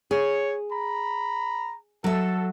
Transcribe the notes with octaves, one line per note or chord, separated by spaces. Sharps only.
G#4 C#5
A#5 B5
F#3 A4 E5